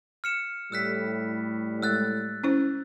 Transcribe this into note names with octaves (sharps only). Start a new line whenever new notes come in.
F6 C#7 E7
A2 G3 E6 F#6 B6
G#3 E6 F#6 A6
C#4 E4 C5